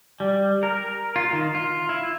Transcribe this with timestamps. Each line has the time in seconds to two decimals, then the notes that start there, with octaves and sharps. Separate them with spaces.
0.20 G3
0.63 A#4
1.16 F4
1.32 D#3
1.55 F4
1.89 E4